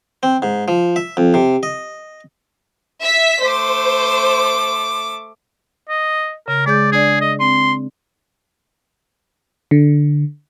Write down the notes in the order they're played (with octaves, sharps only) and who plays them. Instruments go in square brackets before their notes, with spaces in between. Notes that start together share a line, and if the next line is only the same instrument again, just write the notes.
[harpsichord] C4
G#2
F3
E5
F2
C3
D#5
[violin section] E5 B6
[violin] A3 D6 [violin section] C5
[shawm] D#5
[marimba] C#3 [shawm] A#4
[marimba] G#3 G#4 G6 [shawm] D5
[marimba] D4 D5 [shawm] G#4
[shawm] D#5
[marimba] C4 [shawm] C6
[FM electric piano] D3